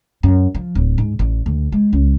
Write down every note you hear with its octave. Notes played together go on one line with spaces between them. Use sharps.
F#2
F3
D1
G#2
A1
D2
G#3
C#2